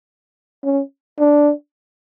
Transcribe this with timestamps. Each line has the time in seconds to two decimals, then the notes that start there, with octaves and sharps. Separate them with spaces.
0.64 C#4
1.19 D4